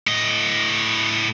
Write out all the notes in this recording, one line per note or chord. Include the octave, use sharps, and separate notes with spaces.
A2 D#5